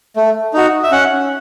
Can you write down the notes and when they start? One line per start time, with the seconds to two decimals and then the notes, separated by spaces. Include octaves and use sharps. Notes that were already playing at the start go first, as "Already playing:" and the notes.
0.16 A3
0.54 D#4 F#4
0.83 E5
0.91 C#4 F#5